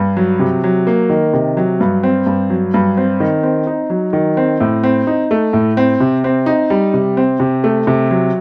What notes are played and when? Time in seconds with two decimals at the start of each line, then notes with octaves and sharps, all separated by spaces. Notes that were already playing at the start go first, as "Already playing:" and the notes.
Already playing: G2
0.17 F#3
0.40 C3
0.64 F#3
0.87 A#3
1.10 D#3
1.34 C3
1.57 F#3
1.80 G2
2.03 C4
2.26 G2
2.50 F#3
2.74 G2
2.97 C4
3.20 D#3
3.43 C4
3.67 D#4
3.90 F#3
4.13 D#3
4.37 C4
4.60 A2
4.83 C4
5.07 D#4
5.31 A3
5.53 A2
5.77 C4
6.00 C3
6.24 C4
6.46 D#4
6.70 G3
6.94 C3
7.17 C4
7.40 C3
7.64 A3
7.87 C3
8.11 F#3